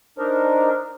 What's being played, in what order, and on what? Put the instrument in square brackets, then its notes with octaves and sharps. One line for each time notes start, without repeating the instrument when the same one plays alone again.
[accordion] D4 D#4 A#4 [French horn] C5